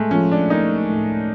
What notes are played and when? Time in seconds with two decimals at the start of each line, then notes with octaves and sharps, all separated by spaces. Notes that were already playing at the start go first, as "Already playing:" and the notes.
Already playing: A2 G#3 A3
0.11 F3 C#4
0.32 D4
0.50 A#3 D#4
0.89 A2